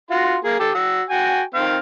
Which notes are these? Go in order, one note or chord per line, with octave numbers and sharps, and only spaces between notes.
F4 F#4 C6
A#3 G#4
G4 A4
F#4 E6
F#4 G5 G#5
D#3 C4 F5